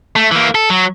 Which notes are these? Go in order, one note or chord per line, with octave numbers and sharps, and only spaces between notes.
A3
E3 A#3
A4
F#3